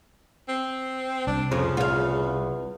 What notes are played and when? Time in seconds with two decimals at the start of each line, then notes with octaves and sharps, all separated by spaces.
0.48 C4
1.27 C2 D4
1.52 F2 C#3 F3
1.77 E2 F4 F5